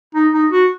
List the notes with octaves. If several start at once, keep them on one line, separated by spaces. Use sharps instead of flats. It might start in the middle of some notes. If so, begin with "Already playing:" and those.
D#4
D#4
F#4